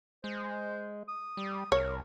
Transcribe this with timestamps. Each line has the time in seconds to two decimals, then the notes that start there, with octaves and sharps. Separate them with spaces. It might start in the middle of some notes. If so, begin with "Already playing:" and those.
0.24 G#3 C5
1.08 D#6
1.37 G3
1.72 C2 A#4 C#5